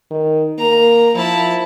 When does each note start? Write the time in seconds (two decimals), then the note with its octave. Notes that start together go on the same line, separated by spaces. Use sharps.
0.11 D#3
0.59 A#3 A#5
1.15 F3 E4 A5